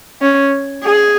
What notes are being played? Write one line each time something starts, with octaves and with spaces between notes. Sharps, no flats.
C#4
G#4